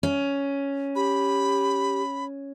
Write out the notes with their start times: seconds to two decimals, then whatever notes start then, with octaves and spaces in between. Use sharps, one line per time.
0.03 C#4
0.96 G4 B5